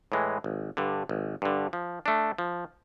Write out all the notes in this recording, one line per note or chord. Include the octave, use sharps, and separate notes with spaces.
A2 E3 G#3
G#1
G2 D3
G#1
G2 D3
F3
A3 D4
F3